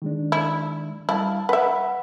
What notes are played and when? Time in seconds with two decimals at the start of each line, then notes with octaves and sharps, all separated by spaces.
0.02 D#3 G#3 D4
0.32 E4
1.09 G3 E4 F5 A5
1.49 B4 E5 F#5 B5